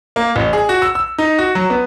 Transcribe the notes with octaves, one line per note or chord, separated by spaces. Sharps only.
A#3
A1
G#4
F#4
E6
E6
D#4
F#4
F#3
B3